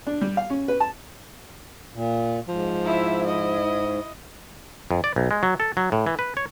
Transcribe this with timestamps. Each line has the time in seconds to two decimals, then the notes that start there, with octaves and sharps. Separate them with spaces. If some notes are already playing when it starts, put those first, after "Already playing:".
0.07 D4
0.21 G3
0.37 F5
0.50 C#4
0.68 B4
0.80 A5
1.94 A#2
2.48 G#2 F3
2.85 E4 E5
3.26 E4 D#5
4.91 F2
5.04 D5
5.16 B1
5.31 G#3
5.43 F#3
5.60 A4
5.77 F#3
5.92 A2
6.06 E3
6.19 B4
6.37 C#5